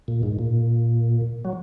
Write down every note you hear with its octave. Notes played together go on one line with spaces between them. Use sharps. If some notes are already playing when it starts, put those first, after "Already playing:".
A#2
G#2
A#2
F#3